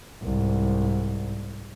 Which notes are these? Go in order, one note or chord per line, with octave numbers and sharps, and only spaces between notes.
C2 G#2